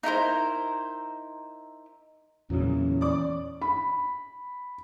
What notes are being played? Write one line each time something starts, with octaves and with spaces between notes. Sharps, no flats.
D#4 E4 A#4 C5
E2 A#2 C#3 E3 F#3 C#4
D5 D6
B5